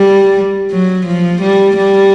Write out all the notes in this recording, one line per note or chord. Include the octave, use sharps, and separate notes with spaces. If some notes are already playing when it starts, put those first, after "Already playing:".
Already playing: G3
F#3
F3
G3
G3